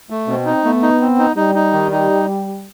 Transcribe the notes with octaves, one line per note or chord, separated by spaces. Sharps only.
A3
B2 C4
D#4
A3 B3
D#4
C4
D#4
G3 D#4
D#4
D#3
D#4